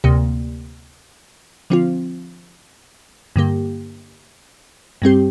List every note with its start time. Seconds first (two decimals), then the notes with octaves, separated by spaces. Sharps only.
0.04 D2 C3 A#3 G4
1.70 D3 F3 C4 F4
3.36 G2 D3 A#3 G4
5.02 G2 G3 C4 G4